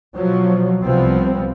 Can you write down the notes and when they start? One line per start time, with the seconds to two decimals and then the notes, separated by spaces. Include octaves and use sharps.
0.15 B2 F3 F#3
0.83 C2 C3 F3 G3 B3 C4